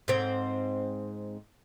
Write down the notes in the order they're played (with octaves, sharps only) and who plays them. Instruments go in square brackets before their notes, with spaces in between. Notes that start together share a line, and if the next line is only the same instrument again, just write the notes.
[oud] G#2 C4